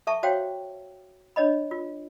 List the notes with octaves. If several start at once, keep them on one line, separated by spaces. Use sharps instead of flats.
A4 E5 A5 C#6
F#4 C5 C#5 F5 G5
D4 C#5 D#5 B5
F4